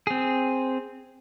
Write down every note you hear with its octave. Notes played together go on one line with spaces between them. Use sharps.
C4 G#4